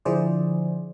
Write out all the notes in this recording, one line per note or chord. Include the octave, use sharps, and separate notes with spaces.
D3 F3 E4 G#4 C5 D5